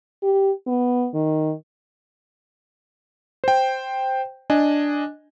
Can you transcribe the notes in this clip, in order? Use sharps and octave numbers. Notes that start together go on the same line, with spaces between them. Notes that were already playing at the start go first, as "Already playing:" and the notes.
G4
B3
D#3
C5 G5
D4 D#5 G#5